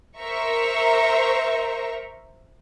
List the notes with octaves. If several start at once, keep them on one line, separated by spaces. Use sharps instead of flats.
A#4 C5 E5 A#5 C#6